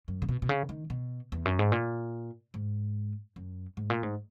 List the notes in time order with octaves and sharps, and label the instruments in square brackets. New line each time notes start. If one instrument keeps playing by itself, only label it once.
[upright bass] F#2
C#3
B2
B2
C#3
D#3
B2
E2
F#2
G#2
A#2
G#2
F#2
G#2
A#2
G#2